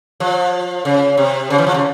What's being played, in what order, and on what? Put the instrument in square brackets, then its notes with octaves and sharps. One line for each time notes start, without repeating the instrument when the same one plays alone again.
[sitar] F3
C#3
C3
C#3
E3
F3
C#3